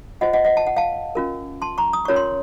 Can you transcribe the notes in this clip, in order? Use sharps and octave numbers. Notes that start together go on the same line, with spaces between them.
F4 C5 D#5 F#5
D#5 F#5
D#5 F#5
A5
F#5
F5 A5
C#4 F4 A#4
A5 C6
A#5 C#6
D#6
C#4 F4 A#4 C#5 C#6
C6